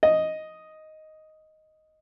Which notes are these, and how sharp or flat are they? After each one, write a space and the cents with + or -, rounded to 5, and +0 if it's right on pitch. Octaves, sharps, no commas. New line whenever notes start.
D#5 +5